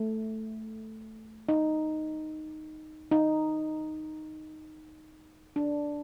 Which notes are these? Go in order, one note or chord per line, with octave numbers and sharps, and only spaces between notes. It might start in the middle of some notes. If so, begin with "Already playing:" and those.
Already playing: A3
D#4
D#4
D4